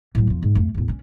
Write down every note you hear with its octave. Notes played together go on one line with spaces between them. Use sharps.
A2 F#3
E2 F3
G#2
F2 A3
E2 A2
C#4 D4